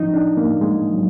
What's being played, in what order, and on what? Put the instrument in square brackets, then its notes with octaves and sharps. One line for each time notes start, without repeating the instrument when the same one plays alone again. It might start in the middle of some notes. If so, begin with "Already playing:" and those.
Already playing: [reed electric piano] F3 D#4
D4
A#3
G#3
F#3